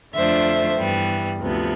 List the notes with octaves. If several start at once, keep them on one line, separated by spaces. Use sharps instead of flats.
F2 D3 A3 D4 F4 C5 E5
G2 E3 G3 B3
D2 C3 F3 B3